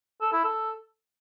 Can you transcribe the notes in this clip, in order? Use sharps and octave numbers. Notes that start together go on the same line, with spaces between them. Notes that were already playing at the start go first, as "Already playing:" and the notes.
A4
E4
A4